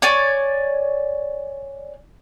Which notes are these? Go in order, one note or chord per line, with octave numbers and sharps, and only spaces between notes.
C#5 D5 G#5